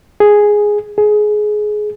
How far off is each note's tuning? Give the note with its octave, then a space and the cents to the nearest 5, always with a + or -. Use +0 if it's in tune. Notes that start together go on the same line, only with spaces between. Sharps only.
G#4 +0
G#4 +20